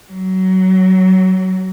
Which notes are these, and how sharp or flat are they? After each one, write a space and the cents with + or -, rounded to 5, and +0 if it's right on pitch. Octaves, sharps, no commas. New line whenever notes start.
F#3 +20